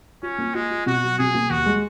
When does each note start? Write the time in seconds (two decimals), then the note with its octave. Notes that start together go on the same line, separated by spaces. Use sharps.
0.23 C#4 F4
0.38 A#3
0.54 G#3 F4
0.70 F4
0.86 B2 F#4
1.03 F#3
1.19 B2 G#4
1.35 A#3
1.50 D#2 F#4
1.66 G#3